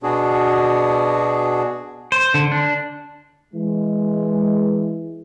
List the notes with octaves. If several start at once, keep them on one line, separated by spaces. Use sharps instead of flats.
B2 B3 D4 F#4 G#4
C5
D3
D4
E3 G#3